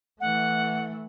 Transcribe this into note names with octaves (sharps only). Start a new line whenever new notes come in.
E3 A3 F#5